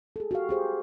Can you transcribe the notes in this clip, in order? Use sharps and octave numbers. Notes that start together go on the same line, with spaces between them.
G#4 A4
F#4 G4 F5
G4 G#4 C5